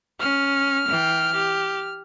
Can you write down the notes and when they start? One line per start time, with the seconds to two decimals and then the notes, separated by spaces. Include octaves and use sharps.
0.20 C#4 F6
0.88 E3 G5
1.32 G4